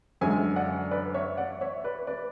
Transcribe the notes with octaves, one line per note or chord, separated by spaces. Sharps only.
F#2 D3 G#3 E5 G#5
D5 F#5
B4 D5
C#5 E5
D5 F#5
C#5 E5
B4 D5
B4 D5